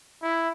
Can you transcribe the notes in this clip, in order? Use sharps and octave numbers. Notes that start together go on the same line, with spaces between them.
E4